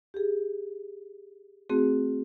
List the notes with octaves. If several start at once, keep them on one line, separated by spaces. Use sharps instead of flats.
G4 G#4
A3 C4 F#4 G#4